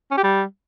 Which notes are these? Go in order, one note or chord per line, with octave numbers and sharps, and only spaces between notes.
C#4
G4
G3